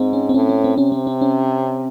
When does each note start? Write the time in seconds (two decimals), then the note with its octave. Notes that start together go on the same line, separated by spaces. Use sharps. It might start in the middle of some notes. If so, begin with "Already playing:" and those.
Already playing: G#2 C4
0.13 C#4
0.29 C4
0.34 A2 C#4
0.49 C#4
0.64 C4
0.78 C3 C#4
0.92 C4
1.07 C4
1.21 C#4